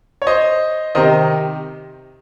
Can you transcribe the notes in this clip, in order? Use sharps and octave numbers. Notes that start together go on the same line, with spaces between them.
C#5
C5 D#5
C3 D#3 C5 D#5